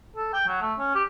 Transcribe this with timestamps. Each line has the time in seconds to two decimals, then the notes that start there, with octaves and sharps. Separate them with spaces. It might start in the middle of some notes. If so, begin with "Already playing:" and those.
0.16 A4
0.33 G5
0.47 F#3
0.61 A3
0.78 C#4
0.95 G4